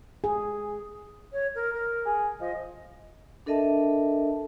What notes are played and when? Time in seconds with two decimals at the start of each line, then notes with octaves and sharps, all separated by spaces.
0.24 G#4
1.33 C#5
1.55 A#4
1.73 A#4
2.05 G#4
2.41 F3 D#5
3.46 D4 A4 A#4 D#5 E5 A5